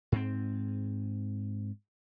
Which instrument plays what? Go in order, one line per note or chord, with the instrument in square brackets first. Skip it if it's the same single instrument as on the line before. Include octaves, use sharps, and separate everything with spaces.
[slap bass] G#2 C4